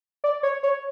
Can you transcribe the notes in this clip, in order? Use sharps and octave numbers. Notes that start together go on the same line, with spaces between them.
D5
C#5
C#5